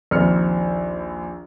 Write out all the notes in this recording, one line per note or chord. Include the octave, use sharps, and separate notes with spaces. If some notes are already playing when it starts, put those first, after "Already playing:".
A#1 D#2 C4 F6 C#7